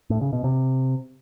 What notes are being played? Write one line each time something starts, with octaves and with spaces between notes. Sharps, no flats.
A2
C#3
B2
C3